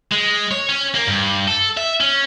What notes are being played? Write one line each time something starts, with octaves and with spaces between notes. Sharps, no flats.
G#3
C#5
C#4
A#3
G2
A4
E5
C#4